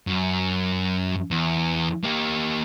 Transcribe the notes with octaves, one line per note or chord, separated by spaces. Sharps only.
F#2
E2
A#3 G4